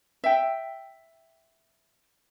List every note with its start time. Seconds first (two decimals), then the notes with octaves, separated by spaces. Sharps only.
0.24 E5 G5